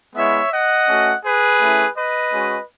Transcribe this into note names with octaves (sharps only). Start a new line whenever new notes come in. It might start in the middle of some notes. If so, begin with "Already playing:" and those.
G#3 B3 E4 C#5 E5
D#5 F#5
A3 C#4 F#4
G#4 B4
A3 C#4 E4
B4 D#5
G#3 C#4 F#4